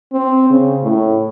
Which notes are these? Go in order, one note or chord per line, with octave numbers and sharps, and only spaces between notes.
C4
C#3
A2